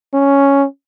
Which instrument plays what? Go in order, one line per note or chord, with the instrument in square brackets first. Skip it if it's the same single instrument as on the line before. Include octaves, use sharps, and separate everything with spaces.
[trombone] C#4